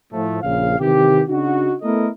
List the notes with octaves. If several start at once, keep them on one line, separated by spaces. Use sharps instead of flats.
A2 F3 A3
A#1 C#3 F5
C3 D#3 E3 G4
C#3 D4 D#4 F#4
A3 B3 E4 A4 A#4 D#5